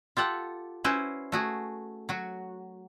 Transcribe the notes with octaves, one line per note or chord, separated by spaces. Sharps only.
F4 G4 A4 F#5
C#4 E4 F#4 B4 C5
A3 F#4 G#4
F#3 F#4